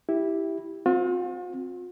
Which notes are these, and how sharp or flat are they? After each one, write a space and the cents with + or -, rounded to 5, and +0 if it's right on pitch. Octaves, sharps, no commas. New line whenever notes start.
E4 -5 G4 +0
C4 +0 F4 +45